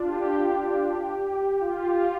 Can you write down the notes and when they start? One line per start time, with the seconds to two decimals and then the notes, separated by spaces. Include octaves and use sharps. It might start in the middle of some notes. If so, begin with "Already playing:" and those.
Already playing: D4 F4
0.08 G4
1.61 F4
1.95 F4